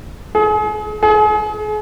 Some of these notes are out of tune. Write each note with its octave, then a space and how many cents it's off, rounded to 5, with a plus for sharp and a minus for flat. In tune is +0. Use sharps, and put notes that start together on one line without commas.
G#4 +35
G#4 +35